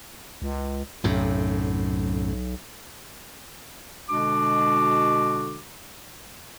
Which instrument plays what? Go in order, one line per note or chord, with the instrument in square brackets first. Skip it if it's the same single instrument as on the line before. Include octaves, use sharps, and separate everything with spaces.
[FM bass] C#2
[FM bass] B1 [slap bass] F#2 A2 C3
[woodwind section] B2 D3 G#3 D4 F#4 D6